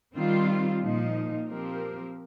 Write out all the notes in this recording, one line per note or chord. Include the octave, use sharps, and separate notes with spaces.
D#3 G3 C4 F4
A#2 F3 D#4
F3 C4 G4 A#4